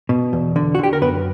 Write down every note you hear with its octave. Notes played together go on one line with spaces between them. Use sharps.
B2
E2
D3
F#4
D3 G4
A#4
F#2 B3 B4